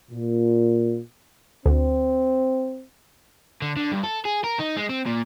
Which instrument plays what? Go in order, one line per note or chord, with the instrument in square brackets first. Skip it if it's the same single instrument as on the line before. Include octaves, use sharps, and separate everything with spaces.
[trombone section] A#2
[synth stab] D2 [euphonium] C4
[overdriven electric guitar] D3
D3
G2
A4
G#4
A#4
D#4
G#3
C4
A#2